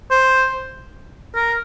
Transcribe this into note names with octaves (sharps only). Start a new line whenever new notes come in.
C5
A#4